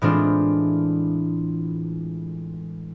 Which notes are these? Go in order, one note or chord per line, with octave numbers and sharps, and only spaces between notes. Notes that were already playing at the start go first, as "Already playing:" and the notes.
A2 E3 G#3 C4 D4 F4